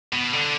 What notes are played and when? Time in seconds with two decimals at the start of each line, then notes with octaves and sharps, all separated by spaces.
0.13 B2
0.33 D3